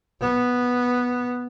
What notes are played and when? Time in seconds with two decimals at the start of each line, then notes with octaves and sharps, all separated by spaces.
0.21 B3